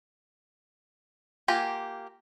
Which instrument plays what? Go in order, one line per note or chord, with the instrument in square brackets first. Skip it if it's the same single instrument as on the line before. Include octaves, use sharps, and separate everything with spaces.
[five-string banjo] A#3 F4 G4 G#5